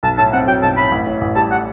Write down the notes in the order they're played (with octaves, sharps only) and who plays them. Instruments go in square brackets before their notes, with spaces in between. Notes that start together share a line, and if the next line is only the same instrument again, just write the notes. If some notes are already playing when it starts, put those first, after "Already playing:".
[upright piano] B1 [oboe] A5
[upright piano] A2 [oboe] A5
[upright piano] C4 [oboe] F#5
[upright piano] F#3 [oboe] G5
[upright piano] B1 [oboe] A5
[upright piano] A2 [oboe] B5
[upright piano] A1
A2
A1
[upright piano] G3 [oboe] A5
[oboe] F#5